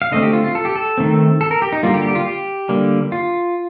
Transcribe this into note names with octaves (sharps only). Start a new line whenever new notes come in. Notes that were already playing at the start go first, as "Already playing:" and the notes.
F5
D3 A3 C4 D#5
G4
F4
F4
A4
G4
A4
D#3 A3 C4
A4
A#4
G4
D#4
D3 G3 A#3 F4
G4
G4
F4
G4
D3 G3 A#3
F4